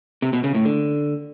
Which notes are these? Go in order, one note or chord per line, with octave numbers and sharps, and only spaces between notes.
C3
B2
C#3
A2
D3